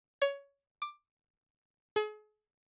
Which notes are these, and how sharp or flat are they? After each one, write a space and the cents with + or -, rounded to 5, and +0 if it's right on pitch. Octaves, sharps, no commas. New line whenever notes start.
C#5 +15
D6 +10
G#4 +40